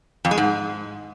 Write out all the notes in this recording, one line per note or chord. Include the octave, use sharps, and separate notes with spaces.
F2
G#3
G#2